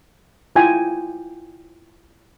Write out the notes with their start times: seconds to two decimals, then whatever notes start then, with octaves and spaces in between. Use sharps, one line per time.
0.56 E4 F4 G5 G#5